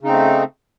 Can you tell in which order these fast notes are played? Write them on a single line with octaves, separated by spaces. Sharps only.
C#3 D#4 C4 A3